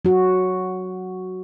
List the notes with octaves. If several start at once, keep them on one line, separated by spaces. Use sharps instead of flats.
F#3 F#4